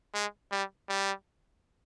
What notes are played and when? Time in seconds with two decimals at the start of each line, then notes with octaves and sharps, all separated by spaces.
0.14 G#3
0.52 G3
0.89 G3